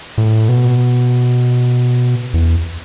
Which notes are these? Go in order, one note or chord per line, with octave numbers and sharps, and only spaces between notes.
A2
B2
E2